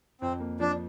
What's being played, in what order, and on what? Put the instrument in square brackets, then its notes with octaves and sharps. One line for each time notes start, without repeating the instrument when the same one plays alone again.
[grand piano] F2 [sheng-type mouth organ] C4
[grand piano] A#3
[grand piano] F3 [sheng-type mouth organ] D4